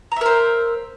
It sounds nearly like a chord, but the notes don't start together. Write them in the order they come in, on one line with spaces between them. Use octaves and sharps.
A#5 E5 A#4 C5